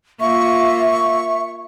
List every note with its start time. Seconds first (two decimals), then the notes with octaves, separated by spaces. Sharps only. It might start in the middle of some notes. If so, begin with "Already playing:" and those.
0.20 A#3 F4 E5 C#6